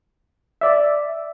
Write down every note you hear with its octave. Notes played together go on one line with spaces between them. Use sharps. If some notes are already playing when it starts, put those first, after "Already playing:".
D5 E5